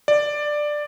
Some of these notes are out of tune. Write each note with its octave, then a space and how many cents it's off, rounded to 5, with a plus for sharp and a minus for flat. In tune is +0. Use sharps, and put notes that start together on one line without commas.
D5 +10